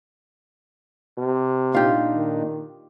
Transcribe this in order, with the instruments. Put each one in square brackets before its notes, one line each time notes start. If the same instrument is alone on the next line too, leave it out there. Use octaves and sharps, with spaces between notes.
[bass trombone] C3
[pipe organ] A#2 D4 D#4 [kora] F4 G4
[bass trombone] D#3